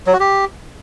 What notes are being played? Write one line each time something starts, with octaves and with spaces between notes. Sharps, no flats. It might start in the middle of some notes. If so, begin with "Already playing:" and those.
F#3
F#4
G4